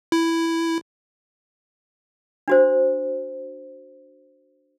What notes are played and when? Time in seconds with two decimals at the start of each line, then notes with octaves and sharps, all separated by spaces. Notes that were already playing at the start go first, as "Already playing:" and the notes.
0.12 E4
2.48 D4 F#4 C5